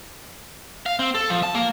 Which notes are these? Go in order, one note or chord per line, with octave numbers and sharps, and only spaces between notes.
F5
C4
A4
F3
A5
A#3